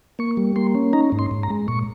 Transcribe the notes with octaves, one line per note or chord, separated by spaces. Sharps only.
A#3 C#6
G3
A#3 C6
C#4
D#4 A#5
G#2
C6
G#2
A#5
G#3
A#2 C#6